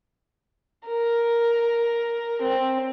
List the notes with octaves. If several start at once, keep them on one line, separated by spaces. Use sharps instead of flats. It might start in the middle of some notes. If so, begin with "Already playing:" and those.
A#4
C4